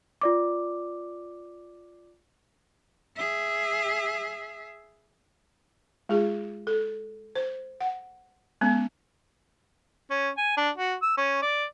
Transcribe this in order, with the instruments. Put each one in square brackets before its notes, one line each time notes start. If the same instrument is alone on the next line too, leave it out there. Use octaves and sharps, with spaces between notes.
[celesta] F4 D5 D6
[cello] G#4 E5
[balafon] G#3 F4 G#4
A4
C5
F#5
G#3 B3 C#4
[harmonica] C#4
G#5
D4
F#4
E6
C#4
D5